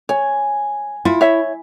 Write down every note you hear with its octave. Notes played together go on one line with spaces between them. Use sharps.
C#5 G#5
E4 F4
C#5 E5